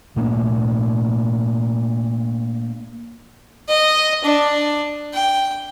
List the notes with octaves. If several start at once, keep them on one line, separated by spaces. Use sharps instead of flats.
A#2 A3 A#3 D4
D#5
D4
G5